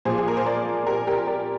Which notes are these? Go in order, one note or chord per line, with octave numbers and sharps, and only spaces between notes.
A#2 F3 G#4 C5
G#4
A#4
C5
A#4 D5
G4 A#4
G4 A#4
A#4 D5